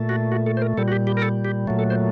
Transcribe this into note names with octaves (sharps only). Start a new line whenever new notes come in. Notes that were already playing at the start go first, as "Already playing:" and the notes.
Already playing: A#2 A3
F#4
F#4
A4
C5
A#4
A#2 G3 A4
F#4
G4
G4
A#4
A4
G4
A#2 F#3 A3
A4
C5